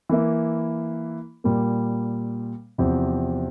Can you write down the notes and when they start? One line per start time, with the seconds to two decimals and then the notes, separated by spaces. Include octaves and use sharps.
0.09 E3 A#3 E4
1.44 A#2 G3 A#3
2.78 E2 C3 F3 C4 G4